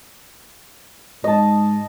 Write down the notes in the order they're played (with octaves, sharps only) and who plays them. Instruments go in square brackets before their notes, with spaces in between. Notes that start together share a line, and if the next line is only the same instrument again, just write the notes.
[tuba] G#2 [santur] D#5 A5